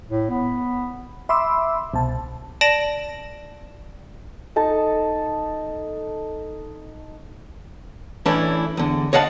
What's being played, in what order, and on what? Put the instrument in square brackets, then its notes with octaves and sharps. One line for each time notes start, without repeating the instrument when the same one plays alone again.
[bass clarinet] A2
B3
[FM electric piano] E5 B5 C6 D6 E6
C2 B2 A5
[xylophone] D5 A5 A#6 D7 F#7
[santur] D#4 A4 A5
[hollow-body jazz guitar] E3 A3 C#4 D4 E4
E2 D3
C#5 D#5 F5 F#5 A5